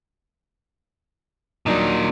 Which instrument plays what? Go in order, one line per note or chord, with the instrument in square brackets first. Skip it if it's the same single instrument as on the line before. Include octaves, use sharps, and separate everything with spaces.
[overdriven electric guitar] A#2 D#3 [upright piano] F#3 D4 D#4